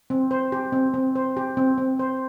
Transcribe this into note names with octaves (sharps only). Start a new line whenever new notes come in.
C4
C5
G4
C4
C4
C5
G4
C4
C4
C5